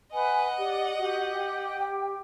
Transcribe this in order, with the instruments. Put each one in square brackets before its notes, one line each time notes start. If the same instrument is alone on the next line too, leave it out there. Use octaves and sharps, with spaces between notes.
[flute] B4 [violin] D#5 F#5 [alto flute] G#5
[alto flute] G4 [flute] D5
[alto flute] F#4 [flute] G4
[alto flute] G5